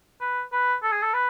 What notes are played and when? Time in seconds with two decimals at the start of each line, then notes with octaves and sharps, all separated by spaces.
0.21 B4
0.52 B4
0.83 A4
0.92 G#4
1.02 A4
1.14 B4